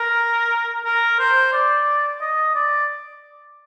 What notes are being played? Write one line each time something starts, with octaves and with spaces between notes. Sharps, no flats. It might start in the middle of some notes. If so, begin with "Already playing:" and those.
Already playing: A#4
A#4
C5
D5
D#5
D5